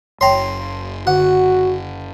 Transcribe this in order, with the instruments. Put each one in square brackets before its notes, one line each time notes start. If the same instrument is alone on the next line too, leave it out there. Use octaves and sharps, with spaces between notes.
[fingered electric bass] F#1 [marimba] C#5 G5 [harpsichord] A#5 C6
[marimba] D3 [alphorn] F#4 [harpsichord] F#5